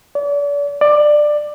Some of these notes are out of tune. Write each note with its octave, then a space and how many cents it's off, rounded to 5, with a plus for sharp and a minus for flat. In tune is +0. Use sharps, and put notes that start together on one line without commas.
D5 -40
D5 +15